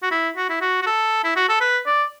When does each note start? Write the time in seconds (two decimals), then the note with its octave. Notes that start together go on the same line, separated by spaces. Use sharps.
0.02 F#4
0.11 E4
0.37 F#4
0.50 E4
0.61 F#4
0.82 F#4
0.87 A4
1.24 E4
1.36 F#4
1.49 A4
1.61 B4
1.86 D5